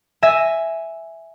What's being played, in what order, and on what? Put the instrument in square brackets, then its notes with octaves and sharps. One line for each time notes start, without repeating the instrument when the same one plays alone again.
[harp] E5 G#5 A#6